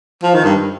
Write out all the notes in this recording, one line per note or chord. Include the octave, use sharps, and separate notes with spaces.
F3
D#3
G2